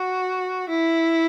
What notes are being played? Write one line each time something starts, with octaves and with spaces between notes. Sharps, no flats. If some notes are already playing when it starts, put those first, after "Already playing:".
Already playing: F#4
E4